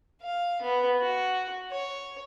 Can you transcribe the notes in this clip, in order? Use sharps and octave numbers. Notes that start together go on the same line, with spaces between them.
F5
B3
F#4
C#5